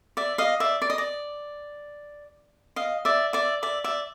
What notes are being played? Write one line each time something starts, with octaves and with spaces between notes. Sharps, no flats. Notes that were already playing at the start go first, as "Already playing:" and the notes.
D5 E5
D#5 F5
D5 E5
D5
D#5
D5
D#5 F5
D5 E5
D5 E5
D5 E5
D5 E5